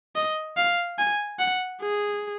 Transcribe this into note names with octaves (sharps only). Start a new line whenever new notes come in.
D#5
F5
G#5
F#5
G#4